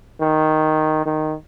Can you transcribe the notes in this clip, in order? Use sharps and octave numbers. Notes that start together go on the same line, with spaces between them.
D#3
D#3